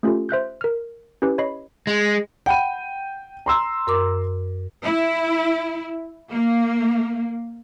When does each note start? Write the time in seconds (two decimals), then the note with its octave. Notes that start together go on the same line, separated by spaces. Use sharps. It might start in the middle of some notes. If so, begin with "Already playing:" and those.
0.03 A3 C#4 F4 G4 A4
0.29 C5 E5 F#6 G6
0.61 A#4 F6
1.22 C#4 E4 G4 B4
1.38 C#5 D#5 B5 C7
1.87 G#3
2.46 F#5 G5 B5 D#7
3.46 A#5 C6 E6
3.87 F#2 A#4 D6
4.85 E4
6.31 A#3